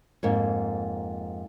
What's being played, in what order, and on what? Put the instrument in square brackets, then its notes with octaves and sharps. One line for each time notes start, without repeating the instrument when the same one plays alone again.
[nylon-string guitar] F2 G#2 A#3